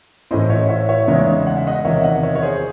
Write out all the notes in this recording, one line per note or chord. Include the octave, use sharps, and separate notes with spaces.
A2 E3 A3 C#4 E4 C5 D#5
C#5 E5
C#5 E5
C#5 E5
E2 C#3 G#3 D#4 C#5 E5
F#5
E5
D#5 F#5
E2 C3 D#3 C#5 E5
E5
D#5 F#5
C#5 E5
C#5
G#4 C5